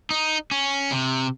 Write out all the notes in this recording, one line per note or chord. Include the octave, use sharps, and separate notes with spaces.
D#4
C#4
C3